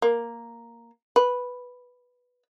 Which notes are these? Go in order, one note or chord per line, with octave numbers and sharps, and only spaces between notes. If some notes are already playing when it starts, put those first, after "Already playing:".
A#3
B4